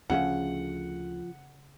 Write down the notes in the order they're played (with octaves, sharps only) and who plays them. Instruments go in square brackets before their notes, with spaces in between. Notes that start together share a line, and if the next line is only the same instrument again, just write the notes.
[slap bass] D2 C4 C#4 [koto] C#3 A3 [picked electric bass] F3 [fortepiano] F#5